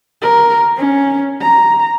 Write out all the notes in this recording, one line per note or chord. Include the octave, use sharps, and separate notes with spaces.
A#4
C#4
A#5